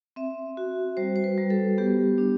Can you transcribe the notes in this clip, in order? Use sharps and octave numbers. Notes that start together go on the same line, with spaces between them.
C4 E5
F#4
G3 C5
C5
B4
G3
A4
B3 G4
D4